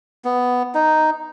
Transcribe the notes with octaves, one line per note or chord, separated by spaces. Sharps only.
B3
D#4